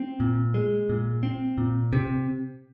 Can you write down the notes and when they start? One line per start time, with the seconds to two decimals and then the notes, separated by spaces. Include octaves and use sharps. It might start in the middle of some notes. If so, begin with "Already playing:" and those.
Already playing: C4
0.20 A#2
0.54 G#3
0.89 A#2
1.23 C4
1.58 A#2
1.93 C3